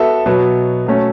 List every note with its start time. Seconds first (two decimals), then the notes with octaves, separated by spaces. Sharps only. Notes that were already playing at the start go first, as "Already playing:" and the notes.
Already playing: B3 F#4 A4 E5
0.26 B2 F#3 B3
0.86 F#3 A3 C#4